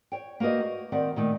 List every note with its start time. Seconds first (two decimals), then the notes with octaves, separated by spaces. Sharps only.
0.12 C#5 G5
0.40 A#3 F#4 B4 C5 D#5
0.61 F#4
0.92 D#3 C4 C5 D5 E5 F#5
1.16 A#2 D#3 A3